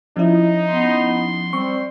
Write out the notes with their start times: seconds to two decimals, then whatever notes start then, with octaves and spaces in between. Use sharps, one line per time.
0.17 F3 C#4 D#4 E4
0.71 B3 C6
1.53 G3 C4 C#6